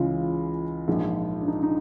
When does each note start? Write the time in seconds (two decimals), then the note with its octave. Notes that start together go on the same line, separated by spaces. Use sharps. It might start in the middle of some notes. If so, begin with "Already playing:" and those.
Already playing: C#2 C#3 E3 F4
0.88 A#1 G#2 F3
1.41 D4
1.48 D#4
1.63 D#4